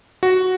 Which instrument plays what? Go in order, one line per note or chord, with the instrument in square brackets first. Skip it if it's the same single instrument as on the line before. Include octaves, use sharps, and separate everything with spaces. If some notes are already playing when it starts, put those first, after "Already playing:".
[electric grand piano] F#4